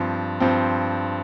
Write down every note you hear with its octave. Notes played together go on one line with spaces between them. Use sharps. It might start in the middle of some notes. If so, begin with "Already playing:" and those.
Already playing: G2 F3 C4
G2 F3 C4